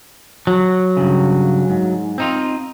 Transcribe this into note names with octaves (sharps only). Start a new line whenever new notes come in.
F#3
G2 C#3
G#2
C4 D#4 F4